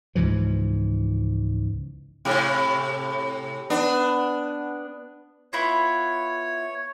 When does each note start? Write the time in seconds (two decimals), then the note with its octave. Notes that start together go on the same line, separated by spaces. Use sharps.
0.15 C#2 G#2 E3 F3
2.25 A2 C3 G4
3.70 B3 D4
5.53 B3 E4 F4 C#5